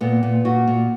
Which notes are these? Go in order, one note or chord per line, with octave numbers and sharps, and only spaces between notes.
A#2 B3
A#2
A#2 F#4
A#2